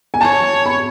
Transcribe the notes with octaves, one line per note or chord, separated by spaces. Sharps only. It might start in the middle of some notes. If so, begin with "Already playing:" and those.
G#5
C#5 A5
B5